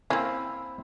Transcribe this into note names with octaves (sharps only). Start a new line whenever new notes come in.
A#3 C4 C#4 E4 F5